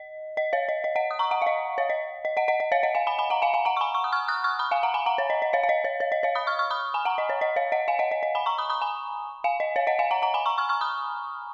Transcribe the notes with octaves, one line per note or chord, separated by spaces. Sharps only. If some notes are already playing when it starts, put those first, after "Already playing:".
Already playing: D#5
D#5
C#5 F5
D#5
D#5
D#5 F#5
D#6
A#5 C#6
F#5 A#5
F5
D#5
C#5 F5
D#5
D#5
D#5 F#5
D#5 F#5
D#5
C#5 F5
D#5 F#5
F5 G#5
G#5 B5
G#5 B5
F#5 A#5
F5 G#5
F5 G#5
F#5 A#5
C#6
G#5 B5
C#6
D#6
C#6 F6
D#6 F#6
C#6 F6
B5 D#6
F5 G#5
F#5 A#5
G#5 B5
F#5 A#5
C#5
D#5
D#5
C#5 F5
F5
D#5
C#5
C#5
D#5
C#5 F5
B5 D#6
C#6 F6
C#6 F6
B5 D#6
G#5 B5
F#5 A#5
D#5
C#5
D#5
C#5 F5
D#5 F#5
F5 G#5
D#5 F#5
D#5
D#5
G#5 B5
A#5 C#6
B5 D#6
B5 D#6
G#5 B5
F5 G#5
D#5
C#5 F5
D#5 F#5
F5 G#5
F#5 A#5
F#5 A#5
G#5 B5
A#5 C#6
C#6 F6
C#6 F6
B5 D#6